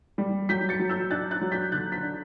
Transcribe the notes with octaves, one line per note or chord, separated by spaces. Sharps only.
G3
F#3 G6 B6
A6 C#7
F#3
E6 G6
D4 F#6 A6
F#6 A6
F#3
G6 B6
D3 F#6 A6
G6 B6
D4